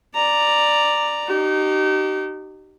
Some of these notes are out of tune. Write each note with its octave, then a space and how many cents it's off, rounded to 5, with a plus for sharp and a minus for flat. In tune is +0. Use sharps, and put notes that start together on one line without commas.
D5 +5 A#5 +0
D#4 -20 G4 -35